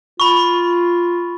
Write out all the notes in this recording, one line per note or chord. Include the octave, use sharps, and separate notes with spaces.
F4 B5 C#6